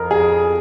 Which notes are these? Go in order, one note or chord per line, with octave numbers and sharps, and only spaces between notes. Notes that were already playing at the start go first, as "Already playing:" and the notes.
Already playing: F2 A#4
G#4